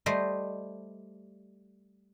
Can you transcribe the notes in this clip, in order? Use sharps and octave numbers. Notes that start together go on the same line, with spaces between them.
G3 A3 C5 D#5